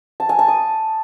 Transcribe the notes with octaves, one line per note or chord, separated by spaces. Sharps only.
A5
G#5
A5
D#6